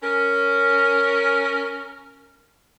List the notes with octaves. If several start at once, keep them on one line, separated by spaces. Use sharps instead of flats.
C#4 A#4